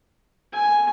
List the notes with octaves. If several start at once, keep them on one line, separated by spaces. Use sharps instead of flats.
G#5